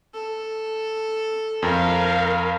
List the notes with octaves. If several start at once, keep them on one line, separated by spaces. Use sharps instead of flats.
A4
F2 A#4 F5